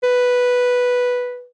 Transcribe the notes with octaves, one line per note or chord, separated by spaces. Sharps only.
B4